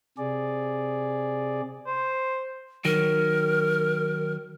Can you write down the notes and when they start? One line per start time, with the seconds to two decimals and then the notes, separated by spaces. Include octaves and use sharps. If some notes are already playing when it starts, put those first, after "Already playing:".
0.18 C3 G#4 D5
1.87 C5
2.85 D#3 F#3 A#4